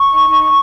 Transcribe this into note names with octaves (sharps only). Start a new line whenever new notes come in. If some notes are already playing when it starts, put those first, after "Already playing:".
Already playing: C#6
D#4
D#4